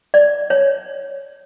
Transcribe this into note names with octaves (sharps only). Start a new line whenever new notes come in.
D5
C#5